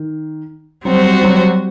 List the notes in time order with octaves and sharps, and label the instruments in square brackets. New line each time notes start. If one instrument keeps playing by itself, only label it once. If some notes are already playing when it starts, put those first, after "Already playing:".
Already playing: [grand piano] D#3
[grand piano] F#3 [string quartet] G3 C4 F#4 C5
[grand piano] F#3